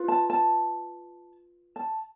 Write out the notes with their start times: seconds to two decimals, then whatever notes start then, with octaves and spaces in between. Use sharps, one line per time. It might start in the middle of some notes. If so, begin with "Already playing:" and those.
Already playing: F4 B4
0.08 A5
0.30 A5
1.76 A5